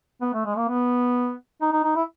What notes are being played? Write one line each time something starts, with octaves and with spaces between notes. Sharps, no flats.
B3
A3
G#3
A#3
B3
D#4
D#4
D#4
E4